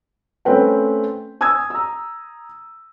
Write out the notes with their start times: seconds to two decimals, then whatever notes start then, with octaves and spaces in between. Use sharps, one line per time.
0.45 A3 C4 C#4 B4 G5
1.41 G#5 D#6 E6 G#6
1.70 A#5 E6